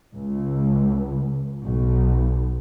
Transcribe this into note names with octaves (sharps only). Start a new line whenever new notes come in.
C#2
B1